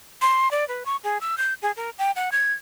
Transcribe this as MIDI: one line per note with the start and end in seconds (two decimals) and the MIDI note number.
0.22 0.51 84
0.51 0.67 74
0.68 0.83 71
0.86 0.96 85
1.03 1.18 68
1.21 1.35 88
1.38 1.54 91
1.62 1.72 68
1.76 1.90 70
1.98 2.11 79
2.16 2.30 78
2.32 2.53 92